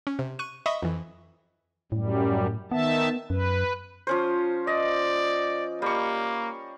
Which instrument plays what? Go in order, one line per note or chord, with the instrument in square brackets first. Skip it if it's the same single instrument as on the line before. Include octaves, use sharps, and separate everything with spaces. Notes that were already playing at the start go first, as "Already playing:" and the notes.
[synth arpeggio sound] C#4
C3
C#6 F#6 D#7
D#5 E5 B5 C#6 D#6
F2 E3
[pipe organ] F#2 G3 [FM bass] A2
[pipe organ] D#3 E5 A5 [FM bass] B3
[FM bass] F#2 [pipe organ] B4
[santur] F3 C#4 C5
[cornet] D5 [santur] D#5
[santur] G3 C#6 [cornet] A#3